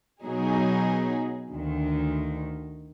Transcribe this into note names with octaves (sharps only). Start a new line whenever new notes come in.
B2 F#3 D#4 G#4
D2 D#3